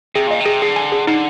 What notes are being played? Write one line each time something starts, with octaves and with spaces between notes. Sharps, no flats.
C3 G#4
A#2 D#5
C3
G#4
D3 G#4
G#5
G#4
D3 D#4